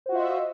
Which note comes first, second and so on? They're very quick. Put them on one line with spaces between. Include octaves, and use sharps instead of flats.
C5 F#4 F4 E5 D#5